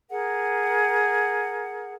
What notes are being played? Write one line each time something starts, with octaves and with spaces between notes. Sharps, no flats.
G#4 A#4 F#5